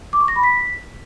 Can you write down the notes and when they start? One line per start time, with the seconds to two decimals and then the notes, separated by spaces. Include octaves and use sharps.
0.13 D6
0.21 C#6
0.28 A#6
0.36 B5
0.43 B6